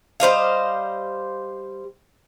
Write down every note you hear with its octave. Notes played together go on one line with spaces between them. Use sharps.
G3 C5 D#5 F5